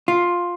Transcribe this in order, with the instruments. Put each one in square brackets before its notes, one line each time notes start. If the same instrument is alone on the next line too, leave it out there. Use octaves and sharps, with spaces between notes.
[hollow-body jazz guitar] F4